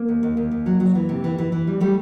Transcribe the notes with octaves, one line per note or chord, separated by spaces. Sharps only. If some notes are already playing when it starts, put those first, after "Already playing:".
Already playing: A#3
D#2
D#2
D#2
D#2
F#3
F#3
E3
C3
E3
E3
E3
G3
G3 A3